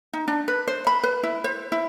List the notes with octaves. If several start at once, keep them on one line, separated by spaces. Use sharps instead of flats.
D#4
D4
B4
C5
B5
B4
E4
C5
E4